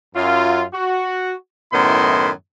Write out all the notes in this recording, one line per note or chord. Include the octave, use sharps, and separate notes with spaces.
F#2 F4
F#4
F#2 A2 D#3 B3 E4 C6